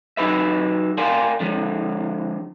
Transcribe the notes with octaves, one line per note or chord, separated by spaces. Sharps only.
F#3 D#4 G#4 B4 E5
A#4 D5 F5 G5 G#5 C6
D3 F3 G#3